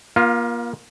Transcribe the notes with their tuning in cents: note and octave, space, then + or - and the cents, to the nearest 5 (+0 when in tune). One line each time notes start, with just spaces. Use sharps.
A#3 +30 F4 +0